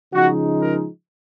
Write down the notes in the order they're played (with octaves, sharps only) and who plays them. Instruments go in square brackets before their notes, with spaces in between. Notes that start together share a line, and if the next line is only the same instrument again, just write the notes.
[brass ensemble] C#3 F3 G#3 D#4 F#4
A#4